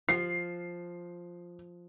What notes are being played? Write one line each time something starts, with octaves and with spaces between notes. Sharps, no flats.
F3 C7